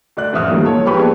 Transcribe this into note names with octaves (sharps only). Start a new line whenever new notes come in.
D2 D5 F#6
A1 F2 C4 E5 D#6 F6
D#3 E3 F#3 G3 A3 A#3
A#2 A4 C#5
G#2 F3 G4 B4 B5 C#6
A#3 B3 D4 G#4 A4